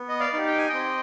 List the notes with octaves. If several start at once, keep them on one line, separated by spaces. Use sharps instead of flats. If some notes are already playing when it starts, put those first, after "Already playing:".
Already playing: B3
D#5
D5 F5
D#4 G4
G5
G#5
C4 D#5 G5